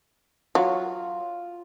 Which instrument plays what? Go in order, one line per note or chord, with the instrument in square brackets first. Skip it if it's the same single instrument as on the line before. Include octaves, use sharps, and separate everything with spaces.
[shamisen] F#3 [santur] F4